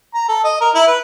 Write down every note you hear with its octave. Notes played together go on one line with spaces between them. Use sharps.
A#5
A4
D#5
A#4
E4
B4